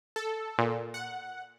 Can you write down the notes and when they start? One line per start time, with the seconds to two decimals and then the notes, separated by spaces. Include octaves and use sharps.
0.16 A4
0.58 A#2
0.94 F#5